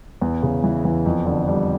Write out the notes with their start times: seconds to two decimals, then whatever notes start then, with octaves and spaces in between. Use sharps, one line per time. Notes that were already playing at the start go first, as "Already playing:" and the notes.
0.21 E2
0.43 C#3
0.64 E3
0.85 E2
1.06 F2
1.26 D3
1.48 G3